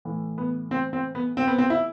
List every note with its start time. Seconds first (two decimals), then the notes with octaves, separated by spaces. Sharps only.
0.05 A2 E3
0.38 B3
0.71 C4
0.93 C4
1.15 B3
1.37 C4
1.47 B3
1.58 C4
1.70 E4